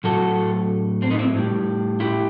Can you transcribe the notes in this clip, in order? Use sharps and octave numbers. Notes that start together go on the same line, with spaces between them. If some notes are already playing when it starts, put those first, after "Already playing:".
A2 F#3 A3 F#4 A4
C4
B3 D#4
C4 E4
A2 G3
E4 G4